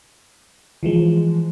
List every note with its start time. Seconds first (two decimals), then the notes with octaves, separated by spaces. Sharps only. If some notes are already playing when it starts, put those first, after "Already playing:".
0.83 E3 F3 G#3